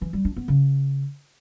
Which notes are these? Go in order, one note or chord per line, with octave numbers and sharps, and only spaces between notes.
E3
G3
D4
B3
C#3